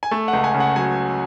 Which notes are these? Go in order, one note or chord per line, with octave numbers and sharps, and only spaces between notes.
G#5
A3 A5
F#5
C#2
G#5
C#3
F#5
F#3 G#5